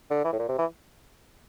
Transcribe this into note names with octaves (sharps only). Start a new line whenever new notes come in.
D3
E3
A2
A#2
C3
E3